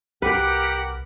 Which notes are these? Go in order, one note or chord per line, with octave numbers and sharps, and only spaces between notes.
C2 G4 A#4 B4 F#5